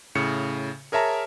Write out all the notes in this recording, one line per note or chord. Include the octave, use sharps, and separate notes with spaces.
A2 C#3 C#7
G#4 A#4 C#5 E5 A5 A#5